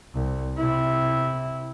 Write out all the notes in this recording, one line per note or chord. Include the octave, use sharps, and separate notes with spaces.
C2
C3 E4